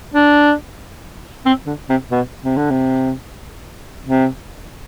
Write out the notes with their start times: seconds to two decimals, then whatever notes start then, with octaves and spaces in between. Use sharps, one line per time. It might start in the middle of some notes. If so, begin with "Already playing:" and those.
0.14 D4
1.45 C4
1.66 D3
1.89 C3
2.11 B2
2.43 C3
2.57 D3
2.71 C3
4.07 C3